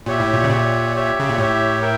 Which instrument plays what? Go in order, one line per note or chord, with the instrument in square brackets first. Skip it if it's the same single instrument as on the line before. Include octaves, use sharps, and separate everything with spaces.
[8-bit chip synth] A#2 [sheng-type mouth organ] G4 C#5 E5
[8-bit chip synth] A2
A#2
C#3
[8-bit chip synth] A#2 [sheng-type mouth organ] G4 C#5 E5
[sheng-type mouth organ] G4 C#5 E5
[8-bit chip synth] C#3
A#2
[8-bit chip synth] A2 [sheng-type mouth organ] G4 C#5 E5
[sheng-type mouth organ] A#4 E5 G5